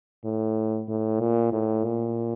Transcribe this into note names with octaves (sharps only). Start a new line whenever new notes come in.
A2
A2
A#2
A2
A#2